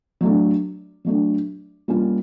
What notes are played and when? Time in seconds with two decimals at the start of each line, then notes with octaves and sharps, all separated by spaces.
0.21 F#3 A3 D4
1.05 F#3 A3 D4
1.88 G3 A#3 C#4 F4